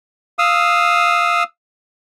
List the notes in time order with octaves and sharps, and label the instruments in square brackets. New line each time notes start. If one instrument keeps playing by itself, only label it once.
[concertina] F5 D#6 E6